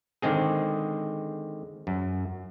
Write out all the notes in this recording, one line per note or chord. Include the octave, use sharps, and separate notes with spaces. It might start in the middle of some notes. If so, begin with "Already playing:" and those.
D3 D#3 G#3 C4 G#4
F#2